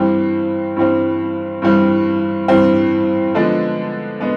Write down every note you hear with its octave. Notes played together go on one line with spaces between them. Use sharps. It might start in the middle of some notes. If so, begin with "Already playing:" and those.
Already playing: G2 E3 G3 C4
G2 E3 G3 C4
G2 E3 G3 C4
G2 E3 G3 C4
D3 F3 G#3 B3 D4
G#3 B3 D4